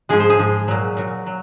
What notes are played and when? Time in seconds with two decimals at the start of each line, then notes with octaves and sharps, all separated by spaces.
0.09 G#2 F3 G#3 G#4
0.20 C5
0.30 G#4
0.38 G#2 F3 G#3
0.68 A#2 F#3
0.97 A#2 F#3
1.26 F#3